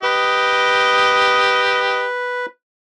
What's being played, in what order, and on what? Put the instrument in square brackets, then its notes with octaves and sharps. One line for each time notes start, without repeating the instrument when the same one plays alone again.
[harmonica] G4 D#5 [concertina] B4